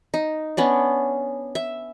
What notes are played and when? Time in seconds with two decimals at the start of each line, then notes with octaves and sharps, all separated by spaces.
0.14 D#4
0.57 B3 C#4 D4
1.55 E5